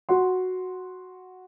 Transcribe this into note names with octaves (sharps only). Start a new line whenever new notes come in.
F#4 F#5 C6